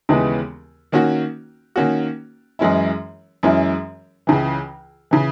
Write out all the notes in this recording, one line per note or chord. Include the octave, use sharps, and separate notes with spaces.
D#2 C#3 E3 G#3 B3
D#3 A#3 C#4 F#4
D#3 A#3 C#4 F#4
F#2 E3 G#3 C#4 E4
F#2 E3 G#3 C#4 E4
C#2 C#3 E3
C#3 E3